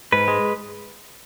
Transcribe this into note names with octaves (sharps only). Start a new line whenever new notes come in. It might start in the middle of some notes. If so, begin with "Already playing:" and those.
G#2 B4
G#3